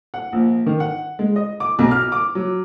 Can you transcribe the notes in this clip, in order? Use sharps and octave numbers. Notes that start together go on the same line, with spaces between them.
F#5
A#1
D#3
F#5
G#3
D#5
D6
B1
F6
D6
F#3